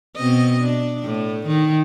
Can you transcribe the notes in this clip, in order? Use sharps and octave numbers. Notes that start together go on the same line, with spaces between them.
B2 C4 D#5
D4
A2
D#3